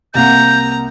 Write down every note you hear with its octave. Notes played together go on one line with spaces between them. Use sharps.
C2 A#3 F#5 A#5 G6